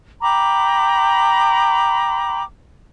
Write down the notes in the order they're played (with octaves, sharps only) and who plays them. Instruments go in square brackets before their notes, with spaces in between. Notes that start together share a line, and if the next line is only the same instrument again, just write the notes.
[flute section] G5 A#5 B5 D6